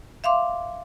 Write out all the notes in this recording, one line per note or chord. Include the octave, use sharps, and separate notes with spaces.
E5 F5 C6 D6